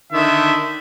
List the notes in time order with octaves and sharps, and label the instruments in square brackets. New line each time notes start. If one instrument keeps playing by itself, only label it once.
[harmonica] D3 D#3 [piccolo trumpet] E5